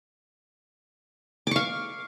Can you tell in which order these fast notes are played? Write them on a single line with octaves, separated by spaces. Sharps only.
D6 C#6 F5